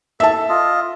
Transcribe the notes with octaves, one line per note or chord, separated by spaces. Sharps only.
A4 E5 A5
F4 D#5